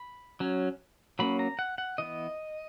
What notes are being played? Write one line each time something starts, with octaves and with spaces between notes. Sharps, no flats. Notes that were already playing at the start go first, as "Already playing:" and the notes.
Already playing: B5
F#3 C#4
F#3 A#3 C#4 B5
A#5
F#5
F#5
E3 B3 D#5